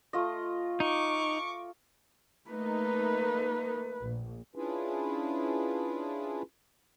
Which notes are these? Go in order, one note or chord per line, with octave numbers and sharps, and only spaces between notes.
A3 F4 D#5
D#4 C#6 D6
A3 A#3 D#4 B4
A#1
C#4 D4 E4 F4 G#4 B4